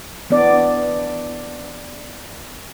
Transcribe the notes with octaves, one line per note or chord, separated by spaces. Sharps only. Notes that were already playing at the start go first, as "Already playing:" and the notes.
E3 B3 D4 D5